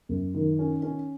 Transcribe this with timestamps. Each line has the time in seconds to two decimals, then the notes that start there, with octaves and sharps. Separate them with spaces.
0.09 F#2
0.34 D#3
0.59 C#4
0.83 C#4